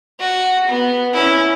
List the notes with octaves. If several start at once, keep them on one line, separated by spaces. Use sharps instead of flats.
F#4
B3
C#4 E4